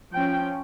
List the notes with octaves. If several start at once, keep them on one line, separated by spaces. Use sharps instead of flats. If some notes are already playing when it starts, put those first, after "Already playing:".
F3 C#4 G5